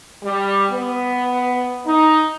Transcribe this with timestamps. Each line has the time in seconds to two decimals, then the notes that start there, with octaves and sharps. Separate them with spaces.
0.23 G3
0.71 B3
1.86 D#4